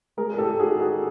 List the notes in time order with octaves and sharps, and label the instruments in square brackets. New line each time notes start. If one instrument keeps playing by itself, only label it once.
[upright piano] G#3 G#4 A#4
A#4
G4 A4
D#4 F#4 G#4
F#4 G#4